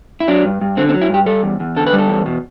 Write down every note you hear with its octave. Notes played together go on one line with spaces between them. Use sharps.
E4
F#3 D4
G2
G2
D3 C4
C4
F#3
E4
G2 G4
G3 A4
E2
E2
D3 A4
B4
G3
A4
E2
B2